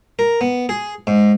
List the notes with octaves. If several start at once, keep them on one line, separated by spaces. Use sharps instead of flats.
A#4
B3
G#4
G#2